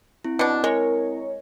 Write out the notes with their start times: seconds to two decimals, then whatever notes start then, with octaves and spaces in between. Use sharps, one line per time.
0.24 C4 E4
0.39 B2 D4
0.64 G#3 A#4 C#5